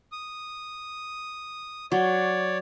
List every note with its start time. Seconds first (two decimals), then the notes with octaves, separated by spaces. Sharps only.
0.12 D#6
1.92 F#3 C#5 D5